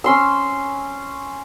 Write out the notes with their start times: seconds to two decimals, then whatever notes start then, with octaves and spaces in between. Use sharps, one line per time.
0.04 C#4 C6 E6